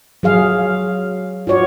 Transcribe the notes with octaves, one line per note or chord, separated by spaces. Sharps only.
F#3 G#4 F5
F4 F#4 C#5 D5